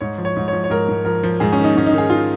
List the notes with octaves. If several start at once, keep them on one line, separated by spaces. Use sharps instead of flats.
G#2 C#5
F3
C#5
G#2
F3 C#5
C#5
G#2 A#4
G#2
F3 A#4
F3
G#2 G#4
D#3 C#4
D#4
G#2 C#4
D#4
D#3
G#4
D#3 F4